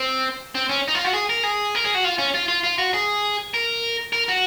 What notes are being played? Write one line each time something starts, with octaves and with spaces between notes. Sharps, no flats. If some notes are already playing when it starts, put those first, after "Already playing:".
Already playing: C4
C4
C#4
D#4
F4
F#4
G#4
A#4
G#4
A#4
G#4
F#4
F4
C#4
F4
F4
F4
F#4
G#4
A#4
A#4
F#4